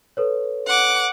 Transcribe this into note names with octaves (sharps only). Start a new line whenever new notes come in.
A4 B4 C#5
F#5 D6